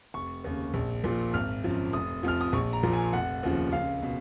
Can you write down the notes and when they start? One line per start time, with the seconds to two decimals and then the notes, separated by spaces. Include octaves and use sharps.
0.14 F1 C#6
0.44 D#2 C#3
0.74 A#1
1.04 A#2 F3
1.34 G#1 F6
1.64 F#2 F3
1.93 F1 D#6
2.23 F2 F3 F6
2.41 D#6
2.53 A#1 C#6
2.73 A#5
2.83 A#2 F3
2.93 G#5
3.13 F1 F#5
3.43 D#2 C#3 F3
3.72 C#2 F5
4.02 B2